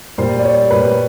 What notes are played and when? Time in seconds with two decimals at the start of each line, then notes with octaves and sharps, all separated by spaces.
0.18 A#2 G3 C5
0.39 D5
0.43 C#5
0.71 A#2 G3 B4